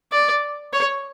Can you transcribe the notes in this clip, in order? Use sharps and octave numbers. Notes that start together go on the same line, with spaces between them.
D5
C#5